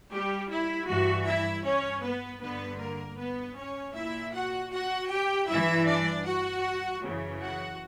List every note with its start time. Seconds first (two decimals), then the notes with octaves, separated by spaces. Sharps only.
0.12 G3 G4
0.50 E4
0.88 G2 E3 F#4
1.27 E4 E5
1.65 C#4 C#5
2.04 B3 B4
2.42 G2 D3 B3 B4
2.80 A#3 A#4
3.19 B3 B4
3.57 C#4 C#5
3.95 A#2 E4 E5
4.34 F#4 F#5
4.73 F#4 F#5
5.12 G4 G5
5.49 G2 E3 E4 E5
5.88 D4 D5
6.27 F#4 F#5
7.04 F#2 C#3 E3
7.42 F#4 F#5